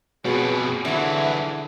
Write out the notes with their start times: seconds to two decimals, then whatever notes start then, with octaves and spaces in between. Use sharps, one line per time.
0.25 F2 B2 B3 F#4 G#4 C#5
0.85 D3 E3 F#3 G#4 E5